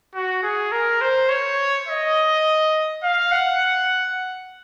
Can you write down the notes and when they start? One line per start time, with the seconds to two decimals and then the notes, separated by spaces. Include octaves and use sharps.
0.14 F#4
0.43 G#4
0.72 A#4
1.01 C5
1.29 C#5
1.88 D#5
3.03 F5
3.32 F#5